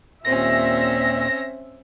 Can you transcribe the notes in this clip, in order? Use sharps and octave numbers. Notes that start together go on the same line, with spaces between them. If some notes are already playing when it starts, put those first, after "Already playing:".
D#2 A#2 C4 C#4 E5 A#6